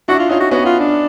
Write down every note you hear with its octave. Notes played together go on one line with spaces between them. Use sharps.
D4 E4 F#4
F4
C#4 D#4 F4
F#4
B3 C#4 F#4
F4
D4